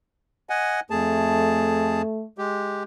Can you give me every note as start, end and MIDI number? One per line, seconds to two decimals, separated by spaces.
0.49 0.80 75
0.49 0.80 78
0.49 0.80 80
0.90 2.02 41
0.90 2.24 57
0.90 2.02 68
0.90 2.02 81
2.38 2.83 56
2.38 2.83 67